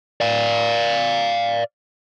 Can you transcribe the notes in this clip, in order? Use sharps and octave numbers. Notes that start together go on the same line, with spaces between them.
D5 F5